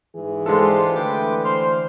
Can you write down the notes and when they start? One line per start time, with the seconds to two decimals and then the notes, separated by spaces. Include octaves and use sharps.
0.15 G#2 E3 G#4
0.46 G#3 D4 F4 G4 A4 C5
0.96 D3 E3 A3 B4 G5 D6
1.45 C5 C6 F6